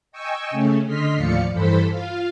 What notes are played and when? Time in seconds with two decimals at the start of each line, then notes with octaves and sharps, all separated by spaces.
0.12 D#5 G5 G#5 C#6 E6
0.51 C#3 A3 C#4
0.86 D3 D#5 C6 F6 B6
1.16 D#2 A2 F3 D5 F5 C#7
1.52 G2 E3 A4 C5 B5 B6
1.90 F4 F5